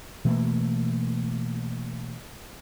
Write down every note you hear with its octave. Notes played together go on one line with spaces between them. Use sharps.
B2 E3 A3 A#3